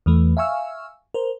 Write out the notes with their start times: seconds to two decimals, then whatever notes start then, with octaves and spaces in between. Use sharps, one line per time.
0.06 E2 E3 A3
0.37 E5 F5 G#5 C#6 E6 F6
1.14 A#4 C5